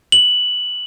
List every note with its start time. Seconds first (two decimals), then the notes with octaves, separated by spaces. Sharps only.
0.12 F#7